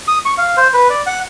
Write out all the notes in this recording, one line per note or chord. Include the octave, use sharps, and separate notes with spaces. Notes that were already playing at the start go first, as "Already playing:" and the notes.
D#6
C#6
F5
C5
B4
D5
F#5